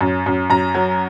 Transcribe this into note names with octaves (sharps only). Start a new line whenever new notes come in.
F#2
F#2
F#2 A#5
F#3